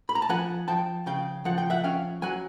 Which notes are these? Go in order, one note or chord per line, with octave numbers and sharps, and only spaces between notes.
B5
A#5
A5
F3 F#5 G#5
F3 G5 A5
C#3 F5 G5
F3 F#5
G5
E5 F#5
C#4 F5 G5
F#3 F#5 G#5